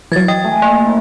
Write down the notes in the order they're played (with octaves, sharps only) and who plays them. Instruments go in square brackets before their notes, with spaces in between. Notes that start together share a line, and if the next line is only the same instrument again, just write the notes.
[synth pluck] E3 F#3 [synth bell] G#6 A6
[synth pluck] D#5 [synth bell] G5
[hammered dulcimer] A3 G#5 A#5
[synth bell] A#3
[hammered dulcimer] E4 A#4 C#5